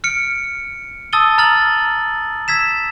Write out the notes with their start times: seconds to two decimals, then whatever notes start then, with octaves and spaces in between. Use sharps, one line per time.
0.04 F6 C#7 D7
1.13 A5 D#6 E6 A6 D#7 G7
1.38 A#5 F6 A6 F#7
2.48 E6 G#6 B6 E7